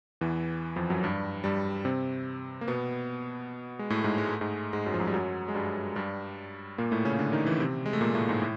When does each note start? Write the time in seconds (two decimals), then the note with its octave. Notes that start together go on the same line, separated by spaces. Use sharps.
0.21 E2 E3
0.76 F2 F3
0.90 F#2 F#3
1.03 G2 G3
1.44 G2 G3
1.85 C3 C4
2.61 A#3
2.68 B2 B3
3.79 G#3
3.90 A2 A3
4.04 G#2 G#3
4.18 G#3
4.29 A3
4.41 G#2 G#3
4.73 G#2 G#3
4.86 F#2 F#3
4.94 F3
5.00 F#2 F#3
5.07 G3
5.14 F#2 F#3
5.48 G#3
5.55 G2 G3
5.96 G2 G3
6.78 A#2 A#3
6.91 A2 A3
7.05 C#3 C#4
7.19 D3 D4
7.32 D#3 D#4
7.46 E3 E4
7.60 C3 C4
7.86 G#3
7.93 A3
8.01 A#2 A#3
8.15 A2 A3
8.29 G#2 G#3
8.42 A2